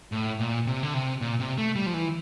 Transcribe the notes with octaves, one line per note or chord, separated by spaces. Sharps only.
A2
A#2
C3
D3
C3
A#2
C3
A3
G3
F3
E3